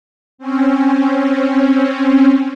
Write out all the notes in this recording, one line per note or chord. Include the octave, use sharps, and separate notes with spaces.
C4 C#4